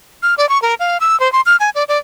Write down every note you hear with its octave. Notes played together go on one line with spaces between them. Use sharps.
F6
D5
C#6
A#4
F5
E6
C5
C6
F6
G#5
D5
D5